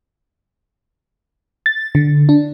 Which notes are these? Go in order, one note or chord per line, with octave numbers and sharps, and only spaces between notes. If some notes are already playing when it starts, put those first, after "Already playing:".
A6
D3
D4